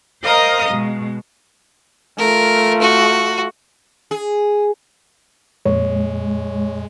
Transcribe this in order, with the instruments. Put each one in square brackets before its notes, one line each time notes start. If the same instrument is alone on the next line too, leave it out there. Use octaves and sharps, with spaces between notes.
[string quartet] A#4 C5 D#5 F5 A#5 D#6
B2 G#3
[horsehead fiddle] A3 F4 [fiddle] A#4
[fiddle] F#4
[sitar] G#4
[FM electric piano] F2 A#2 [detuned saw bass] G#3 [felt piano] C#5